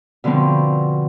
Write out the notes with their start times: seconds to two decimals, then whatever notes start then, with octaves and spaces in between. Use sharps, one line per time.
0.24 B2 D3 F3 B3 C4